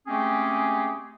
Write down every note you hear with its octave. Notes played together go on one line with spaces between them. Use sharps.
G#3 A3 C4 C#4 G4 G#4